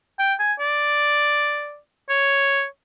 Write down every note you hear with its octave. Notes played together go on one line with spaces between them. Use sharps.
G5
G#5
D5
C#5